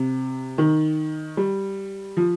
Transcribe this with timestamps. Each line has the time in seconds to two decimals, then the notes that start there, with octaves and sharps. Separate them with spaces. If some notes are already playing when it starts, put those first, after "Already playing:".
Already playing: C3
0.58 D#3
1.37 G3
2.17 F3